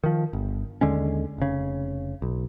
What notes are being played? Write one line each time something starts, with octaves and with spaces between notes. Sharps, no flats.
D#3 F3
G1
D#2 D3 G#3 C#4
F1 C#3
B1